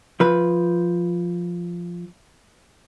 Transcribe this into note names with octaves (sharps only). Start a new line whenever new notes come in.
F3 B4